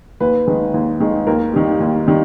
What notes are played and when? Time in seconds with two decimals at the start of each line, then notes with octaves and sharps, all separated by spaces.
0.20 D#2 B4
0.47 D#3 G#3
0.74 D#2
1.00 D#3 G#3
1.27 D#2 A#4
1.53 D#3 G3
1.80 D#2
2.07 D#3 G3